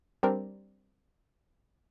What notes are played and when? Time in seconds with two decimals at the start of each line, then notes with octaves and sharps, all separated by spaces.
0.23 G3 C4 D4 A#4